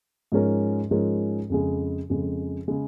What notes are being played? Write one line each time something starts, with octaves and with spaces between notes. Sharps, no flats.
G#2 F3 G#3 C#4 A#4
G#2 F3 G#3 C#4 A#4
F2 C#3 G#3
F2 C#3 G#3
C#3 G#3